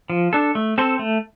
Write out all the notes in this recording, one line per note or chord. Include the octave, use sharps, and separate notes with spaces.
F3
D4 A4
A3
C4 A4 C5
A3